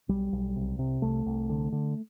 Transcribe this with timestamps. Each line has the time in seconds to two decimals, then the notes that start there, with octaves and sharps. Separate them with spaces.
0.09 B1 G3
0.32 B1
0.56 C2
0.79 C3
1.02 C2 A3
1.26 C2
1.49 D3
1.72 D3